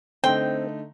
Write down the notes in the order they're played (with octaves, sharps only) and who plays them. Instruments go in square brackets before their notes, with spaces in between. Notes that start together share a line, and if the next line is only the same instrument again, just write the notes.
[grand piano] D3 A3 D#4 [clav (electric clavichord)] C4 [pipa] G5